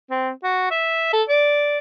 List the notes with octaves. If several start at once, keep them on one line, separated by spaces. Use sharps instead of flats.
C4
F#4
E5
A4
D5